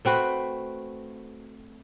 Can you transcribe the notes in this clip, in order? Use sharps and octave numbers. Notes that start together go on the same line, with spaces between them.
A3 C4 F#4 B4